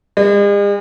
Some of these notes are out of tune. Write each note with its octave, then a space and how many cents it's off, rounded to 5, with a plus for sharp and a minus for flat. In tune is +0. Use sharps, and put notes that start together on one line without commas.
G#3 -45